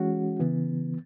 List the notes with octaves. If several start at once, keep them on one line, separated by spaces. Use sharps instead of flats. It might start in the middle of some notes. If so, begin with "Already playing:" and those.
Already playing: E3 G#3 C#4 F#4
C#3 E3 B3